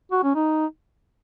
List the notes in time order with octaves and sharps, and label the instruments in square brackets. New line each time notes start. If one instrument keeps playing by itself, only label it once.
[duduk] F#4
C#4
D#4